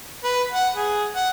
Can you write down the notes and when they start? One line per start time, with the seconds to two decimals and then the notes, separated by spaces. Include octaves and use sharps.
0.24 B4
0.52 F#5
0.76 G#4
1.15 F#5